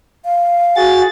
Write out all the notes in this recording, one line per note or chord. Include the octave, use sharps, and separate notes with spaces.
F5
F#4 G#4 A6